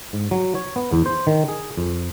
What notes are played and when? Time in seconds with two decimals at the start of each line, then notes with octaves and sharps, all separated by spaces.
0.13 G#2
0.31 F#3
0.55 C#5
0.76 B3
0.93 E2
1.06 C5
1.27 D#3
1.48 G#4
1.77 F2